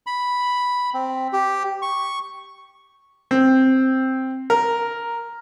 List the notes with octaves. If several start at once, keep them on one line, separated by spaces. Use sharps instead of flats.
B5
C4
G4
C#6
C4
A#4